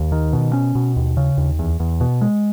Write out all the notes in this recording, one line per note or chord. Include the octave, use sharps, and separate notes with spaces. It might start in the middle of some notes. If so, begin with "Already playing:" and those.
Already playing: D#2
D#3
B2
C#4
B2
D#2
C#3
D#2
E2
E2
B2
G#3